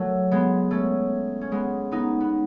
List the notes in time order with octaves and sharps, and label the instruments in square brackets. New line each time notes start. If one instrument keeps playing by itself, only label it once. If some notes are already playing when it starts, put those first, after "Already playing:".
Already playing: [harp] F#3 A3
G#3 B3
A3 C#4
C#4
G#3 B3
B3 D#4
B3